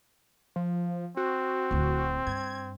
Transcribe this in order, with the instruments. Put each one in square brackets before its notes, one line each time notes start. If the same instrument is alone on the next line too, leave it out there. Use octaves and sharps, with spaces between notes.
[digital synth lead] F3
[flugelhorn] C4 [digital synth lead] F#4
[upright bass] D1 D2
[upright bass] G2 [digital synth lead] G#6